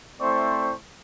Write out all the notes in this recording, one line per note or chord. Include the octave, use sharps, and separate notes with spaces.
A3 C4 E4 C5 D5 C#6